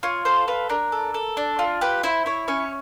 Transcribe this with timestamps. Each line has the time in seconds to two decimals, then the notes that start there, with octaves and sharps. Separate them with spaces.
0.03 F4 C#5
0.25 A4 C5
0.48 F4 B4
0.69 D4 A#4
0.92 A4
1.14 A4
1.37 D4
1.59 F4
1.81 G4 B4
2.03 E4 C5
2.26 E4 C#5
2.48 C#4 C#5